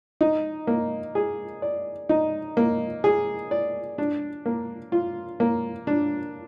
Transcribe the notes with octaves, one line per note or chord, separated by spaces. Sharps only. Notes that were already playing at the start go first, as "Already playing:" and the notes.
D#4
A#3
G#4
D5
D#4
A#3
G#4
D5
D4
A#3
F4
A#3
D4